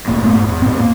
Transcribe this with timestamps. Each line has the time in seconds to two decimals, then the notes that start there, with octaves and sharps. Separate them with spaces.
0.07 D#1 A2 A#3
0.23 G#2 A3 B3
0.35 G#2
0.48 E2
0.62 A2 B3 C4
0.80 A#3